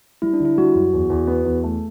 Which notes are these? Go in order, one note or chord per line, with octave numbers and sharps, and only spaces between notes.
G3 E4
D4
D3
E4
G3 F#4
F#2
E2
E2
B3
E2
A3